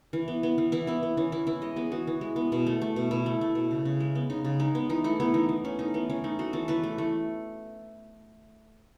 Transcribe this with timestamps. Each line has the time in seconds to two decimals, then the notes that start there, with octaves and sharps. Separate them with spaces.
0.13 E3
0.28 B3
0.43 B3
0.58 E3
0.72 E3 E4
0.87 B3 E4
1.03 B3
1.17 E3 C#4
1.32 E3 E4
1.47 E3 E4
1.62 G#3 D#5
1.76 B3 G#4
1.92 E3 F#4
2.07 E3
2.21 G#3
2.36 B3
2.52 B2
2.66 A3
2.81 A3
2.96 B2
3.11 B2 E4
3.26 A3
3.41 A3
3.55 B2
3.71 C#3
3.85 C#3
4.00 G#3
4.15 B3
4.30 C#3 D#4
4.44 C#3
4.60 G#3 D#4
4.75 B3
4.89 E3 D#4
5.04 A3 E4
5.20 A3 B3
5.34 E3 D#4
5.49 E3
5.64 A3 C#4
5.79 A3 D#4
5.94 E3 B3
6.09 E3 C#4
6.24 A3 D#4
6.39 A3 F#4
6.53 E3 A4
6.68 E3 B4
6.83 A3
6.98 A3